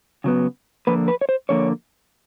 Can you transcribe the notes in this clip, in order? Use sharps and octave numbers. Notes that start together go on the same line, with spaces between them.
C#3 F#3 B3
D3 F3 A#3 B4
B4
C#5
C5
D3 F3 A#3 C#5